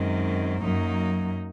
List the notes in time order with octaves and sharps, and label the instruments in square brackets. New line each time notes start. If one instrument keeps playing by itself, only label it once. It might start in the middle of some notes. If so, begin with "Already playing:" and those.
Already playing: [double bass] F#2 [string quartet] D#3 G#3 C4
[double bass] F#2 [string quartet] F#3 A#3 D#4